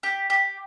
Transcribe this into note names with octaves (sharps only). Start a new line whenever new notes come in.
G4
G4